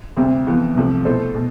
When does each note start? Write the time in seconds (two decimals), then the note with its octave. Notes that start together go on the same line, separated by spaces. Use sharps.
0.16 D2 C3 G3 C4
0.47 F2 E3 B3
0.75 C2 C3 F3 A3
1.05 B2 A3 E4 A4 C5
1.35 B2 A3